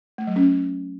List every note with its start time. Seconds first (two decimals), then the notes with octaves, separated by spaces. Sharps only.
0.18 A3
0.27 F#3
0.36 C#4